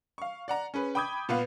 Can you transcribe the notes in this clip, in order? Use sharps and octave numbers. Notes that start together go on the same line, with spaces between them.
F5 C#6
D5 F#5 A#5
C#4 G#4 B4
G5 B5 D6 D#6 G6 G#6
A#2 B3 B4 F5